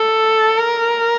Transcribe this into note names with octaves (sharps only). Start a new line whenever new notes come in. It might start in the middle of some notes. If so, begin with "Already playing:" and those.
Already playing: A4
A#4